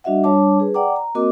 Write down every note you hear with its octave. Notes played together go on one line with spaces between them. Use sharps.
G3 D4 F#4 D#5 E5 F#5
G3 D4 C#5 A5 D6
G#4 B4
D5 F#5 G5 A#5 D6
A#5
A#3 C4 F#4 A#4 D#5 D6